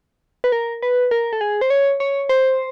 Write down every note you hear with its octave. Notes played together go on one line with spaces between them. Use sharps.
B4
A#4
B4
A#4
A4
G#4
C5
C#5
C#5
C5